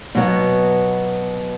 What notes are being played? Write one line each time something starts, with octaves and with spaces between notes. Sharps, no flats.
B2 F#3 B3